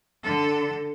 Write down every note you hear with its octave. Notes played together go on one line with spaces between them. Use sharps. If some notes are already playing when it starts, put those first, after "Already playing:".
D3 A4